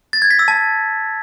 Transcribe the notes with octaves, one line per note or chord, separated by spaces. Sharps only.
A6
G#6
B6
E6
A5